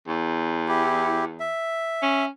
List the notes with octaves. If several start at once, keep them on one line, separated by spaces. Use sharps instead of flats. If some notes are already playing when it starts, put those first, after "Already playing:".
E2
E4 G4
E5
C#4